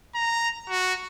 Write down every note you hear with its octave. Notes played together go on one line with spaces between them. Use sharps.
A#5
F#4